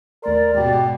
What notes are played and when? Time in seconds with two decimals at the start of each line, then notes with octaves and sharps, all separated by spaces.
0.24 D#2 A3 A#4 D5 C6
0.54 G#2 B2 G#3 F#4 G4